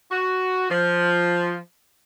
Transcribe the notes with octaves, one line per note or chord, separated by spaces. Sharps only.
F#4
F3